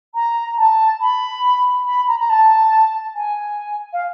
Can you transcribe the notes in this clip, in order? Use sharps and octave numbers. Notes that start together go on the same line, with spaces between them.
A#5
A5
B5
B5
A#5
A#5
A5
G#5
F5